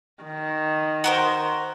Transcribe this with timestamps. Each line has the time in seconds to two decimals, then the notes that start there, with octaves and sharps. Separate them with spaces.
0.24 D#3
1.04 F#4 A#4 C5